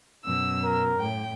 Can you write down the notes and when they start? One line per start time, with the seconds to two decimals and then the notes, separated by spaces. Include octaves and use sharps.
0.25 F#2 B2 E6
0.62 A#4
1.00 A2 G5